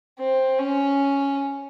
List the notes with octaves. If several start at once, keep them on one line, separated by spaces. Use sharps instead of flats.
C4
C#4